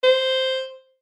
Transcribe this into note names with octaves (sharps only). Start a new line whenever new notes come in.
C5